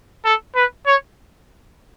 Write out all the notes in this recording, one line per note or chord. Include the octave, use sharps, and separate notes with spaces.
A4
B4
C#5